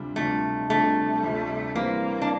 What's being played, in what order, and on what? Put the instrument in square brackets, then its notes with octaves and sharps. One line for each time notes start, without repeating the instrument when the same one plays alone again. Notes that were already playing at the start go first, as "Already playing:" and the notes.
Already playing: [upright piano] D2 C3 G3 D4 F4
[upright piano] D2 C3 G3 D4 F4 [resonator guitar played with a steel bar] A3
[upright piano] D2 C3 G3 D4 F4 [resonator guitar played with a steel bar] A3
[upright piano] D2 C3 G3 D4 F4
[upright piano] E3 G3 C4 [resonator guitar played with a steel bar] A#3
[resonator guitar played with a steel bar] D4